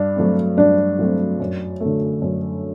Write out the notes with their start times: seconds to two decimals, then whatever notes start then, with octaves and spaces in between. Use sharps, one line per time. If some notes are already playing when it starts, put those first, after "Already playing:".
Already playing: G2 D4
0.16 F#3 A3 C4
0.57 G2 D4
0.99 F#3 A3 C4
1.40 F#2
1.80 D3 A3
2.22 F#2